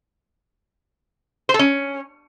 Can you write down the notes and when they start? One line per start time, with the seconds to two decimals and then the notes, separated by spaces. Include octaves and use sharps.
1.49 C5
1.54 A4
1.59 C#4